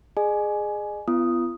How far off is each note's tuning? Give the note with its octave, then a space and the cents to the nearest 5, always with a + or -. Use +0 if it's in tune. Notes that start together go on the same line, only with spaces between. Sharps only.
G#4 +0 D#5 -40 G#5 +15
B3 +25 F4 -40 D#6 +0